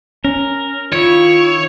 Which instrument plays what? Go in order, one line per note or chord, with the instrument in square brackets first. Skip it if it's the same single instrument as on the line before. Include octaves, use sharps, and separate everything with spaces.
[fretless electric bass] C#4 [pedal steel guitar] A#4
[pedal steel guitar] D#3 E4 [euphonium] F4 [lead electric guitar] C#5